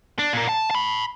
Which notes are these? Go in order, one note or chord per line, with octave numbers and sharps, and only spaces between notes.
D4
A#2 A#3
A5
A5 B5